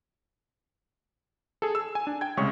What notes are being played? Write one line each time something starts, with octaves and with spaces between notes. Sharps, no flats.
G#4 A4
E6
G#5
D4
G5 G#6
C2 C#3 G#3 C#4 C#6